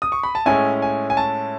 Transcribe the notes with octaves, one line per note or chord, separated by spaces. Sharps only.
D#6
C#6
B5
A5
A2 G#3 C#4 E4 G#5
G#5
G#5
A5